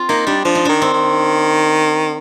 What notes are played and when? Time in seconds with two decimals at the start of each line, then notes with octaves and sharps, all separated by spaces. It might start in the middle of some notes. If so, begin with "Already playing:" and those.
Already playing: C4 F4
0.09 A#3 D#4
0.27 G3 D4
0.45 F3 D4
0.55 D#4
0.65 D#3 D4
0.82 C4
0.93 D#3